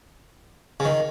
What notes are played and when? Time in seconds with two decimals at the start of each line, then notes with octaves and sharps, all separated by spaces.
0.80 C#3
0.85 D#3